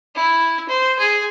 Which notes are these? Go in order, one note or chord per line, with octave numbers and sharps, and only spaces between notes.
E4
C5
G#4